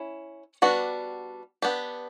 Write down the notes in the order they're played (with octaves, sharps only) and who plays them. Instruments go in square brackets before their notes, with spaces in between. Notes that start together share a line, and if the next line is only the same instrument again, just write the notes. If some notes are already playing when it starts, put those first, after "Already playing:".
Already playing: [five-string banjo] C#4 E4
G3 B3 D4 F#4
B3 D4 G4